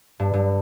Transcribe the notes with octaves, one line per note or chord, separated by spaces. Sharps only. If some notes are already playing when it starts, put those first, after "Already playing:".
G2
G2